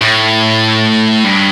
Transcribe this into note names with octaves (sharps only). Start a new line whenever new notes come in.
A2
G2